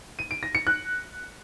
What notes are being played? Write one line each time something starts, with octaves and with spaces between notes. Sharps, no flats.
D#7
D7
A#6
C#7
F#6